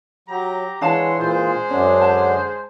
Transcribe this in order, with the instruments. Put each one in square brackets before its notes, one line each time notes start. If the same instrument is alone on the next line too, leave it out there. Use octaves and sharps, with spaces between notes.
[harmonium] F#3 [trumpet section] G4 A#5
[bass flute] E3 [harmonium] G#3 [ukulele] D4 F5 A5 [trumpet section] C#5 F#5 C6
[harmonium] A#2 F4 [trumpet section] G#3 G#4 C5
[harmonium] F#2 D3 D4 [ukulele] C#4 [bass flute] C#5
[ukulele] A5